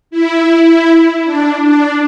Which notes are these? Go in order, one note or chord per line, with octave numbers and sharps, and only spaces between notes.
E4
D4
D4